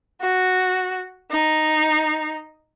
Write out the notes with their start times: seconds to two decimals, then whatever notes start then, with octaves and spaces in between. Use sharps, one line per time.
0.21 F#4
1.32 D#4